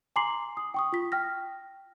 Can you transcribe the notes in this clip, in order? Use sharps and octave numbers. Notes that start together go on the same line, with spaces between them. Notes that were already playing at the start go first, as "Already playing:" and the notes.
G#5 A#5 C6 D6 C7 F#7
D#6
G5 C#6 D#6
F4 B6
G5 F6 A#6